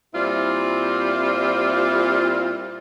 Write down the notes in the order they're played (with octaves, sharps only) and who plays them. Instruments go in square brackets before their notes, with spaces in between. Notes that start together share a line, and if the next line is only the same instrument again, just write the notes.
[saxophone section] A#2 G3 C4 E4 F4